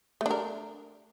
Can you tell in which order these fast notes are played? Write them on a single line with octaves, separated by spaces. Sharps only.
A3 D4 A#4